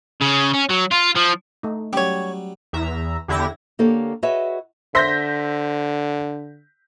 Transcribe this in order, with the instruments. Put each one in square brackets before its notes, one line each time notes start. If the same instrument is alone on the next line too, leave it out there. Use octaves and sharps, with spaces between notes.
[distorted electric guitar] C#3
C#4
F#3
F4
F3
[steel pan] A3 D#4
[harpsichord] F#3 G3 [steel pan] C#4 [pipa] G4 C#5
[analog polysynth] E2 E5 A#5
E2 D3 E4 G4 G#6 A#6
[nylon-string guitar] D3 A#3 G4 A4 C#5
F#4 G#4 B4 C#5 D#5 E5
[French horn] D3 [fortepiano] C5 E5 C6 [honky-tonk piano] G6 A#6 B6